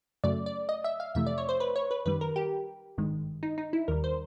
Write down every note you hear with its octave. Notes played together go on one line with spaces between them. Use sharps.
F#2 C#3 F#3 A3 D5
D5
D#5
E5
F5
F2 C3 E3 A3 E5
D5
C#5
C5
B4
C#5
B4
F#2 D#3 G3 B4
A#4
G4
G#1 G2 D#3 G#3
D#4
D#4
E4
D#2 D#3 G3 A#4
C5